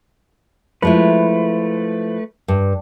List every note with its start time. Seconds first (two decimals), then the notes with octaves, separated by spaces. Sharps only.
0.82 F3 G#3 A3 E4 B4
2.48 G2